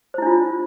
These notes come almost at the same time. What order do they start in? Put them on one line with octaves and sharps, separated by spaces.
C5 E4 D4 F4